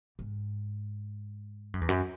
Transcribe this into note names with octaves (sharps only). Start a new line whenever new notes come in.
G#2
F#2
E2
F#2